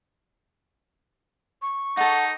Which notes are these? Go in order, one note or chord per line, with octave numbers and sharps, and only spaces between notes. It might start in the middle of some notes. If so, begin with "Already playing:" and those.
C#6
D#4 A4 F#5